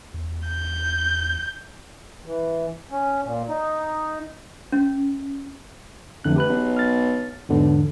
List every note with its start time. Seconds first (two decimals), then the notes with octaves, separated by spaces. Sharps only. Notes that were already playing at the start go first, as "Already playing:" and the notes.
0.14 E2
0.48 G6
2.26 E3
2.91 C#4
3.24 A#2
3.49 D#4
4.72 C#4
6.24 A1 F2 D3 F#6
6.36 G4 B4 F#6
6.49 B1
6.77 F6 A6
7.49 B1 E2 G#2 D3